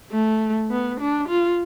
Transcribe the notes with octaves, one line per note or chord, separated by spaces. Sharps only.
A3
B3
D4
F4